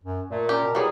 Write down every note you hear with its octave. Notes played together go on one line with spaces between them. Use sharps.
F#2
A#2 A3
C#4 G4 A#4
B2
E3 F#3 G3 G4 G#4